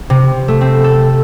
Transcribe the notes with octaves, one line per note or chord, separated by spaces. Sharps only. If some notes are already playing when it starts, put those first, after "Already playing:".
C3
A3
C4
A4